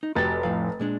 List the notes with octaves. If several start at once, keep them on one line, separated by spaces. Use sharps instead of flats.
D#4
F1 F#4 G4 A6
A2 F3 F5
A#2 G#3 D4